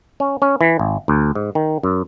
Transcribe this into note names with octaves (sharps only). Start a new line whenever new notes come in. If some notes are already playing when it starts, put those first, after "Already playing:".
C#4
C#4
E3
G#1
D2
G#2
D#3
F#2